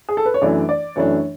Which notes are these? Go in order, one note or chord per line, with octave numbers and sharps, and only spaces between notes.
G#4
A4
B4
C#5
F#2 E3 A3 D4 D5
D5
F#2 E3 A3 D4 C#5